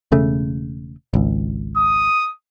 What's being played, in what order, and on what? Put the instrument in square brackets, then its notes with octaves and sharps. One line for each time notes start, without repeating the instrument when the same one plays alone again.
[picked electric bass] E1 C#3 A3
G#1 C#2
[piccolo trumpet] D#6